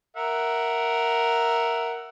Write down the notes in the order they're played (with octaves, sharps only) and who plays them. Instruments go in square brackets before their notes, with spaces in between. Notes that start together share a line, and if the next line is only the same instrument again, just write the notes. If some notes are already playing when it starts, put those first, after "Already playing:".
[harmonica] A#4 E5 F#5